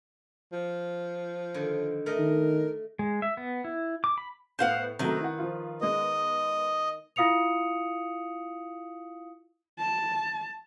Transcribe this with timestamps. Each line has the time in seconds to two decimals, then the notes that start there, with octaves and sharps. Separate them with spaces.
0.52 F3
1.54 D3 D#3
2.06 A3 A#4 D#5
2.18 D#3
2.99 G#3
3.22 E5
3.37 B3
3.64 E4
4.04 D6
4.18 B5
4.59 A2 B3 C5 F5 F#5 C#7
4.99 C3 D#3 F#3 A3 B4
5.21 E4 F#5
5.39 F3 F4
5.81 G#3 B3 D#5
7.16 E4 F4 F5 D#6 C#7 F7
9.78 A5